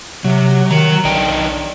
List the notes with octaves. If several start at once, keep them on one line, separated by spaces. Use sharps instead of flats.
C3 F#3
D#3 F#3 A#5
B1 D4 D#4 G5